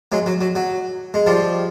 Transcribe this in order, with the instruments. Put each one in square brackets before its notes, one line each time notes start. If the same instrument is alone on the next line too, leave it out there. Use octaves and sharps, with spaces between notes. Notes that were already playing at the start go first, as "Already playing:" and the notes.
[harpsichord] F#3 G#3
F#3
F#3
F#3
G#3
F3 G3